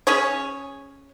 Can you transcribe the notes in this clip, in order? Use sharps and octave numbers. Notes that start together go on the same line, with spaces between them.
C#4 G#4 C#5